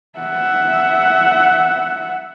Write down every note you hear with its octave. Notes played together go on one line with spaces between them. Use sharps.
E5 F#5